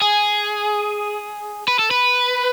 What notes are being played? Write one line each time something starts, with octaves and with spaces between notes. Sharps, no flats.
G#4
B4
A4
B4